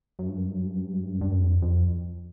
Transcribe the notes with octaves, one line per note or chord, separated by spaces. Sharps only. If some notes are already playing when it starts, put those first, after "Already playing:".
F#2
G2
F#2
G2
F#2
G2
F#2
G2
F#2
G2
F#2
G2
F#2
F2
F2